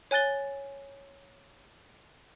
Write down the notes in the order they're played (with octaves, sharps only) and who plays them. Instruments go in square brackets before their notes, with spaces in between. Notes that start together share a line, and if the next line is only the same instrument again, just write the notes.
[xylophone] C#5 G#5 F#6 A6 G7